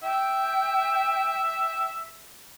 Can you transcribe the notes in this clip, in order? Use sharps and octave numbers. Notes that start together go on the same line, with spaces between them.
E5 G5